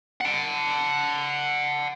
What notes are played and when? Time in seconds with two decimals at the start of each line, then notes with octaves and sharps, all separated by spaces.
0.21 F#5 A5